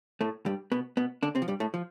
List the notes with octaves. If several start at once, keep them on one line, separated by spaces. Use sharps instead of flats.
A2 A3
G2 G3
B2 B3
B2 B3
D3 D4
C3 C4
F3
G2 G3
A2 A3
F3